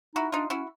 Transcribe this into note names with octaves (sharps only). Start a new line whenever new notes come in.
D#4 E4 F#4
D4 D#4 F4
C#4 E4 F#4